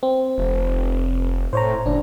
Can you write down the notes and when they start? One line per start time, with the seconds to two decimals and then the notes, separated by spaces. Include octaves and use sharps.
0.03 C4
0.38 F1
1.53 A2 C5 C#5 A#5
1.86 F#1 D4